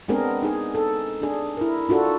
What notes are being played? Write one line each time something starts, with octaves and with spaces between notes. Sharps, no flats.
G#3 B3 C4 D4 G#4 A#4
D#4 G#4
A4
D4 G#4
E4 A#4
D4 F4 F#4 A4